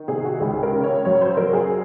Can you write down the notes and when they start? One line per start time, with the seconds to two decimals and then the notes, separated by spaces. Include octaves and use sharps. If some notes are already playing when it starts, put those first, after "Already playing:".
Already playing: D#3
0.08 C3 G#4
0.25 F#4
0.40 C#2 G#4
0.63 A#4
0.73 C#3
0.84 C#5
1.05 F#2 C#5
1.21 C5
1.37 F#2 A#4
1.53 G#4